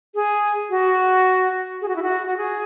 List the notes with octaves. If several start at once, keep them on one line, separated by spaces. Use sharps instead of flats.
G#4
F#4
G#4
F#4
E4
F#4
F#4
G#4